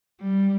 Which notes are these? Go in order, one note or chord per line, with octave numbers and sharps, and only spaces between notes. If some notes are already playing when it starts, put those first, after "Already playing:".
G3